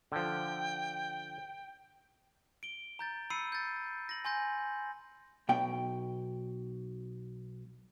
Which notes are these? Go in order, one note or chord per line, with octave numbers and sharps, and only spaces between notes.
D3 F3 G5
D7 G7
A#5 G6 A6
B5 E6 C7 C#7 D#7
G6 A6
A#6 F#7
G#5 C6 G6 A#6
B1 B2 G5